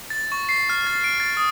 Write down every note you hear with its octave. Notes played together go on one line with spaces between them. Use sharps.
A6
C#6
C7
F6
A6
D7
A6
D#6